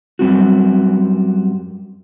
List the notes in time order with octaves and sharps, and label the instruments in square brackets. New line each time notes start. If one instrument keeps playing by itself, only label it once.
[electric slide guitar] F#2 G3 C4 F#4